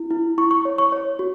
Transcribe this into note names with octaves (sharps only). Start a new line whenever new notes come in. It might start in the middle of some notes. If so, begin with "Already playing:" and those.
Already playing: E4
E4
E4 C#6
C#6
C#5
C#6
C#5
F#4